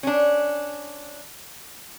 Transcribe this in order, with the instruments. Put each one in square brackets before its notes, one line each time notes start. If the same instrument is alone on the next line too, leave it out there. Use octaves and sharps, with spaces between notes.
[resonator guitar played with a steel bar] C#4 D4